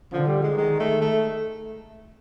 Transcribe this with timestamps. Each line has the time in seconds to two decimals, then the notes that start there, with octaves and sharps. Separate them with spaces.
0.12 D3 F3
0.27 G3
0.42 G#3
0.57 D#3 G#3
0.80 A3
1.01 A3